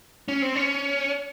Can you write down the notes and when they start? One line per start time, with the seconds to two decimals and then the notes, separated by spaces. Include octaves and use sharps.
0.28 C#4
0.42 C4
0.56 C#4